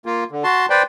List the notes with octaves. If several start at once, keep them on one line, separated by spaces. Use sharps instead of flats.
A#3 F4
D3
F#4 A5 C6
B4 C5 D5 G5